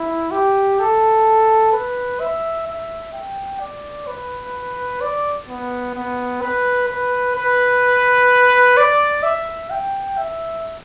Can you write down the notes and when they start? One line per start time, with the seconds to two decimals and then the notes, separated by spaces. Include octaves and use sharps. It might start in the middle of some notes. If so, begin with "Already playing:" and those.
Already playing: E4
0.31 G4
0.79 A4
1.73 B4
2.20 E5
2.67 E5
3.13 G5
3.60 D5
4.07 B4
5.01 D5
5.48 B3
5.94 B3
6.42 B4
6.88 B4
7.36 B4
8.77 D5
9.23 E5
9.70 G5
10.17 E5